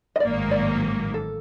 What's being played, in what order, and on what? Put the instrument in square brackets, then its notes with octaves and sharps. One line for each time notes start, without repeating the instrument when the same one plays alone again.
[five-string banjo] D#5
[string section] A1 G#2 D#3 F#3 A#3 [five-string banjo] D5
[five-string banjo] D5
A4